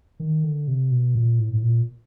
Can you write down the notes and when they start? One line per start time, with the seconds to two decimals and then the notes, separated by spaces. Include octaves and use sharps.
0.20 D#3
0.44 D3
0.68 C3
0.91 B2
1.15 A#2
1.39 A2
1.53 A2
1.63 A#2